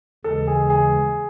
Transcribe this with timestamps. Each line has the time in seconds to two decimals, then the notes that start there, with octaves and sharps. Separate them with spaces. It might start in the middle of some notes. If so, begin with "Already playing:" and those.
0.24 D#2 C#3 E3 G#3 A4
0.47 G#4
0.70 G#4